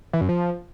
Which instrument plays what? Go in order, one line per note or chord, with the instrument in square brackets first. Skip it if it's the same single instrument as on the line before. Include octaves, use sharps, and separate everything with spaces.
[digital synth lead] E3
F#2
F3